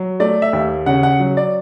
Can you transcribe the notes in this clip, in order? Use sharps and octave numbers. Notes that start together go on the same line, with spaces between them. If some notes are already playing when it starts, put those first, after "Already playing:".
Already playing: F#3
A3 D5
E5
D#2
C#3 F#5
F#5
F#3
D5